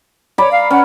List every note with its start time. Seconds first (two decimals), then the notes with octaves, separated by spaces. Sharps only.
0.38 C#5 D5 A#5 B5
0.52 F5
0.70 C#4 F#5